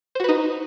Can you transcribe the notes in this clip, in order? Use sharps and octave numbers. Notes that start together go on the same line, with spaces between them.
D#4 F#4 B4 C5